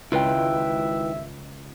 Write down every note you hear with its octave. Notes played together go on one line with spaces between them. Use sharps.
G#1 C#2 E4 F4 B4 E5 G5